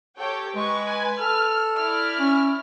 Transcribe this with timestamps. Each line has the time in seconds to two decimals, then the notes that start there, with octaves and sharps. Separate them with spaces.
0.18 G4 A4 C#5 G5
0.56 G#3 B4 C#6
0.88 G#5
1.19 A4 F6
1.76 E4 D5 F6
2.19 C#4